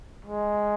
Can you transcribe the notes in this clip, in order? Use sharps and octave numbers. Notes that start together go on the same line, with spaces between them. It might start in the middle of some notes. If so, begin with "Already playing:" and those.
G#3